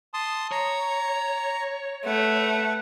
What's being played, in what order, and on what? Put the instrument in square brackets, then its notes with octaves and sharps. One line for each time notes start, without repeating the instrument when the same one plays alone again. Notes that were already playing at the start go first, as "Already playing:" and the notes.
[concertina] A5 C6 D#6
[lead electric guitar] C#5 [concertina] A#5
[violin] A3 [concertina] B4 F#5